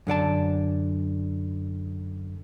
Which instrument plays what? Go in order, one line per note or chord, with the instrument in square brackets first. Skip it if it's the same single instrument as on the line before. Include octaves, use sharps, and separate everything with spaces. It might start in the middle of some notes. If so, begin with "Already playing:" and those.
[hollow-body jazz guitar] F#2 D3 D5 A5